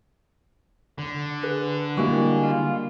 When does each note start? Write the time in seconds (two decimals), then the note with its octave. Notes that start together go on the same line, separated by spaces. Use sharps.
0.99 D3
1.43 G#4 B4
1.97 G3 G#3 A#3 E4 F#4 G4
2.44 F4